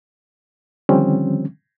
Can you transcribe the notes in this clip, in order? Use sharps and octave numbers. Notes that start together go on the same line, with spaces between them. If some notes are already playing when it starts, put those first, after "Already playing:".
D3 D#3 F3 G3 C4 C#4